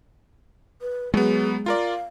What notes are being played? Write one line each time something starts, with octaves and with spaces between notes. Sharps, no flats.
B4
F#3 G#3 B3 G#4
F4 A#4 D5 F5